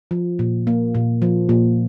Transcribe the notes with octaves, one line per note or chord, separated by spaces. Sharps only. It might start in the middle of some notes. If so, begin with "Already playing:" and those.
F3
A#2
A#3
A#2
F3
A#2